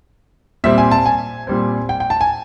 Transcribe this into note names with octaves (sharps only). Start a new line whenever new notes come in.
A#2 G3 C4 E5
G#5
A5
G#5
A#2 G3 C4
G5
G5
A5
G#5